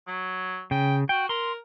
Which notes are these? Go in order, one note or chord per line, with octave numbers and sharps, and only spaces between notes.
F#3
C#3 G5
F#4 G5
A#4 C6